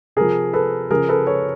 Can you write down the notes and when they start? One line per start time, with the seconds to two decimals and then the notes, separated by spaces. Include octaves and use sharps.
0.16 C3 F3 G#4 A#4
0.53 A4 B4
0.90 C#3 F3 G#4 A#4
1.09 A4 B4
1.27 B4 C#5